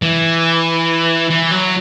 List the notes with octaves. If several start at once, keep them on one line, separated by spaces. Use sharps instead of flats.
E3
E3
F#3